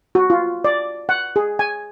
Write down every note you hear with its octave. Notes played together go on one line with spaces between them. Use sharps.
F#4
F4
D5
F#5
G#4
G#5